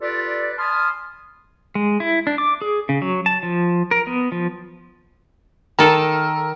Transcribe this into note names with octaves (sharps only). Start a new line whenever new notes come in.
F4 G4 A4 B4 D5
G#5 A5 B5 C6 D#6 F6
G#3
E4
D4
D6
G#4
C#3
F#3
A5
F3
A#4
B3
F3
D#3 A4 A#4